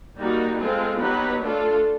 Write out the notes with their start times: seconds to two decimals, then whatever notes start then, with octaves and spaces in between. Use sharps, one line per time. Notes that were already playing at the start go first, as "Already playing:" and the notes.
0.17 G3 A#3 D#4 F#4
0.59 G#3 C4 F4 A4
0.99 F#3 B3 D#4 G4 B4
1.42 A3 D4 F4 A4